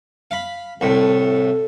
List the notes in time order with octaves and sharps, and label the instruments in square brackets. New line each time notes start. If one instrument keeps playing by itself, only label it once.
[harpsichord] F5 B5
[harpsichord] C2 A2 [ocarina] A4